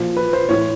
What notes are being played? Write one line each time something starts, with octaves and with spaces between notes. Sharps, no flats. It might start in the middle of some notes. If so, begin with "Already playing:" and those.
Already playing: A#2 F3
B4
C5
A2 E3 C#5